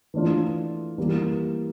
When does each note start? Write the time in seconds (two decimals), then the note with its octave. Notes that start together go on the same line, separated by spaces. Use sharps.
0.14 E3 A3 D4 F4
0.98 E3 G3 A#3